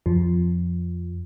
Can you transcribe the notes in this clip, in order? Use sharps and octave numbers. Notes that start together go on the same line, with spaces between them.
F2 F3